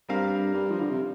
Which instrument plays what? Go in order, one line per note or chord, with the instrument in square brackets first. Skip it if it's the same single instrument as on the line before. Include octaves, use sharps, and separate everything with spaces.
[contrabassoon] G2 [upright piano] G3 C4 A#4 F5
[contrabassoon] G2
F3
D3
C3